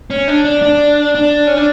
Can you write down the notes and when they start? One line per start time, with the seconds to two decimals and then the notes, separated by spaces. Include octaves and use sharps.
0.10 C#4
0.28 D4
0.45 D4
0.62 D4
1.15 D4
1.47 C#4
1.57 D4